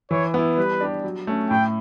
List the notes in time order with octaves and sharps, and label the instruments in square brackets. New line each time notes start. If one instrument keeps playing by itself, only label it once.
[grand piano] E3 [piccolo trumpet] C#5
[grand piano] B3 E4
[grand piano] G3 [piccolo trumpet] B4
[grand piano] D4 G4
F#3
A3 C#4
[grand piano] A2 [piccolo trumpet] G5